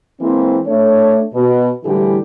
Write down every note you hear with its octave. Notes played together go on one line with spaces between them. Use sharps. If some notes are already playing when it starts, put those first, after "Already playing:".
E3 G#3 A#3 C4
A3 D4 C#5
B2
A2 D3 E3 G3 G4 G#4